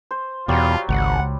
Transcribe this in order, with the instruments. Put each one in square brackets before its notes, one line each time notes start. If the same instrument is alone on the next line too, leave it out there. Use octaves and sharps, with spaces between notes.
[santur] C5
[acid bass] E2 [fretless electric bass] B2 [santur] F#3 G3 [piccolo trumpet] F4
[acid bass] G#1 [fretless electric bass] C#2 [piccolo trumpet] F#5